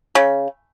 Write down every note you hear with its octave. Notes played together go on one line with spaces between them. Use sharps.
C#3